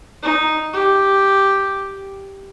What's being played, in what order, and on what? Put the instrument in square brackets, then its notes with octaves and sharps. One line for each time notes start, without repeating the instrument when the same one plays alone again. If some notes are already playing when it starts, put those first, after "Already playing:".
[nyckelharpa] D#4
G4